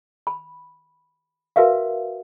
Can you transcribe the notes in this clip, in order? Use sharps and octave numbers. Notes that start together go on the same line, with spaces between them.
B5
F#4 A#4 B4 E5 F5